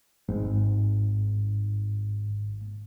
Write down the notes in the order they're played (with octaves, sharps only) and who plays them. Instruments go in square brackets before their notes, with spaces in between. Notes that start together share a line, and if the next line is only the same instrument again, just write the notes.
[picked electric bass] G#1 [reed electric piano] G#2